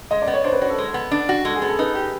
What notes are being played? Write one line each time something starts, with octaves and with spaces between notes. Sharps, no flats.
G#3 D#5
D5
B3
C#5
D4 C5
B4
F#4 C#5
A4
G#3
B3
D4
F#4
G#3 A4
G#4
B3
A4
D#4 B4
G4